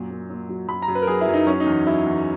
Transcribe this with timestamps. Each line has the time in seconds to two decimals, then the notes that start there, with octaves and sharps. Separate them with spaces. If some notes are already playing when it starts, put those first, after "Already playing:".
Already playing: F#2 A#2
0.10 A#2
0.30 A#2
0.49 F#3
0.68 F#2 B5
0.82 A#5
0.88 F#2
0.95 B4
1.02 A#4
1.07 F#3 G#4
1.21 E4
1.28 F#2
1.34 D#4
1.47 F#3 C#4
1.60 D#4
1.66 E2
1.87 F#3 E4
2.06 E2